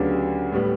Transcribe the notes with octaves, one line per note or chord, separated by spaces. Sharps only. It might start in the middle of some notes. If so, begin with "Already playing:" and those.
Already playing: D2 C#3 F#3 B3 D4 G4
A2 G3 B3